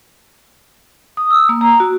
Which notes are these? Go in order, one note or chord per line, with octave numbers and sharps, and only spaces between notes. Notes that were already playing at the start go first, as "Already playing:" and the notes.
D#6
E6
A#3
A#5
F#4